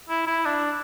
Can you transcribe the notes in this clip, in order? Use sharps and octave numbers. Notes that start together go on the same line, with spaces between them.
E4
E4
D4